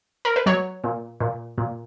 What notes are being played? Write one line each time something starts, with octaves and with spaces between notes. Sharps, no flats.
A#4
B4
F#3 C#5
A#2
A#2
A#2